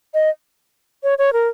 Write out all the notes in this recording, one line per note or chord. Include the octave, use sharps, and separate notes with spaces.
D#5
C#5
C#5
A#4